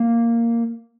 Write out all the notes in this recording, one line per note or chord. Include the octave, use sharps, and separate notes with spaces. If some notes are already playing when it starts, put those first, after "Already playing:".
Already playing: A#3